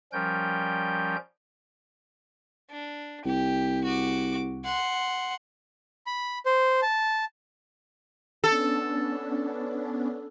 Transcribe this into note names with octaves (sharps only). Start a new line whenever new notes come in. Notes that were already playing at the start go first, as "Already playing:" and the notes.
F3 G3 C#4 A#4 G5 G6
D4
C2 G4
F#4 D6
F#5 C6
B5
C5
A5
B3 C#4 D4 A4